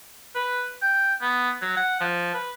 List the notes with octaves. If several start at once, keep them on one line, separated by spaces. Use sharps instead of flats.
B4
G5
B3
F#3
F#5
F3
B4